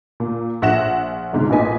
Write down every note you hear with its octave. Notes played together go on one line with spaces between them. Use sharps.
A#2
A#1 E5 F#5 A#6 E7
G1 G#2 C3
A1 A#2 B4 D#5 G#5 B6